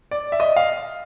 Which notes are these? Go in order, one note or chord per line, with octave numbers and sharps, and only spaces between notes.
D5
E5
D#5
F5